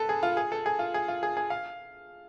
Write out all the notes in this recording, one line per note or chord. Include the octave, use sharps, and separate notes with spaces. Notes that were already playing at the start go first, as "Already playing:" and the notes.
Already playing: A4 B4
G#4
F4
G#4
A4
G#4
F4
G#4
F4
G#4
G#4
F5